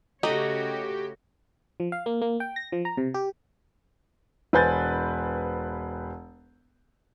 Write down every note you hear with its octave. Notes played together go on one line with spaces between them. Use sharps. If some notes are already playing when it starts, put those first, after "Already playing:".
C#3 A3 D#4 F#4 G4 C#5 D#5
F3
F5
A#3
A#3
G5
A#6
F3
A#5
C3
G4
E1 B4 C5 G#5 G6 A6